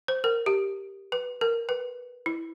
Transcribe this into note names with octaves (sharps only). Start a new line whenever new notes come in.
C5
A#4
G4
B4
A#4
B4
E4